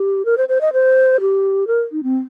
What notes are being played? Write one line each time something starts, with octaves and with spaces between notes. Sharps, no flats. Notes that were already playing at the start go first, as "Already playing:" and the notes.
Already playing: G4
A#4
C5
C5
D#5
C5
G4
A#4
D#4
C4